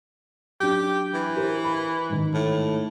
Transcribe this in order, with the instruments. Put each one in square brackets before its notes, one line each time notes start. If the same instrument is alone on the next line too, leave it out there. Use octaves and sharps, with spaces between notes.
[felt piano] F#3 D4 [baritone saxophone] G4
[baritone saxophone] E3
[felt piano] G4 A#4 C5
B5
G#2 D#3
[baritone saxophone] A2